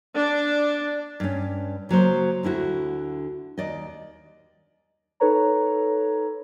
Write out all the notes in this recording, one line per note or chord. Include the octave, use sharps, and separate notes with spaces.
D4
G2 C#4
C#3 F#3 A#3 C5
D2 D3 E4 F#4
D#2 D5 D#5
D#4 A4 B4 C#5 A#5